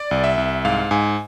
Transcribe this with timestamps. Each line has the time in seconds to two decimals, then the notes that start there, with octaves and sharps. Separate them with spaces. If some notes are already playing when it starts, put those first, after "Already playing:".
Already playing: D5
0.11 C2
0.24 E5
0.38 C2
0.65 G#2 F5
0.91 G#2 G#5